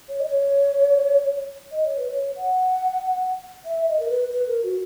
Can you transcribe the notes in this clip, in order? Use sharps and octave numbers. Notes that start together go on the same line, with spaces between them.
C#5
D#5
C#5
D#5
C#5
B4
C#5
F#5
E5
D#5
A#4
B4
B4
A#4
F#4